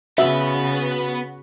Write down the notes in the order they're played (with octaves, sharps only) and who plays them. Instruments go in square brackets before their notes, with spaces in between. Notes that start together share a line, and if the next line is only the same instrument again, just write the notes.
[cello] C#3 [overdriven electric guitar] B3 B4 [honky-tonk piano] F#4 [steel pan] E5